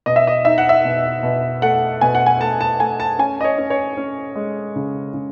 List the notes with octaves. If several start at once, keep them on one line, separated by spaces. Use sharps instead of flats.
B2 D#5
E5
D#5
D#4 E5
F#5
E5
B2
B2
A3 F#5
B2 G#5
F#5
G#5
A3 A5
A5
A3 G#5
A5
C#4 G#5
D#5
C#5
C#4
C#5
C#4
G#3
C#3
C#3